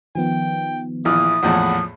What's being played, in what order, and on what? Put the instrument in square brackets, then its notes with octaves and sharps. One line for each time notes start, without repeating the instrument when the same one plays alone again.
[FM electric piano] D#3 F3 B3 [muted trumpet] G5
[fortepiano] A#1 E3 F6 [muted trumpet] E4 [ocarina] D#6
[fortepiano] A#1 E2 A2 [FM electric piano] F3 [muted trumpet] F#5